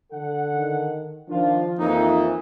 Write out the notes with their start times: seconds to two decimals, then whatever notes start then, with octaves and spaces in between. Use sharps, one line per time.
0.12 D3 A4 F#5
0.55 D#3
1.29 D#3 F3 D4 F4
1.79 F2 E3 A#3 D#4